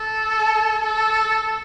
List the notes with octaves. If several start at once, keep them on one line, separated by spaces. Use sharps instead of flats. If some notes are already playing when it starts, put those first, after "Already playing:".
Already playing: A4
A4